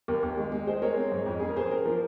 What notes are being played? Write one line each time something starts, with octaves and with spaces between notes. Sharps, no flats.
D#2 A#4
D#2
G#3
G#3
G#3 G#4 C5
G#3 A#4 C#5
C4
G#2
F2
C#4 G#4
A#4
A#3 G#4 C5
A#3 A#4
F3 A#4